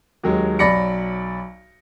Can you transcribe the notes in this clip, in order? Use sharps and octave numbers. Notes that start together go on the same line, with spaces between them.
D#2 F#3 G#3
B1 F#3 D5 B5 A#6 C#7